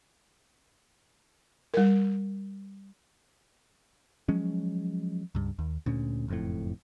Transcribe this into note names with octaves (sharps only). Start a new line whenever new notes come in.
G3 A#4
F3 F#3 G#3 C#4
C#2 G2
D#2
D2 A#2 C#4
F#1 F2 A2